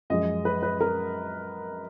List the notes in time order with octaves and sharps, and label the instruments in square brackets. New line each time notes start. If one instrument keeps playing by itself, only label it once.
[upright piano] F#2 F3 G#3 D#5
B4
B4
A#4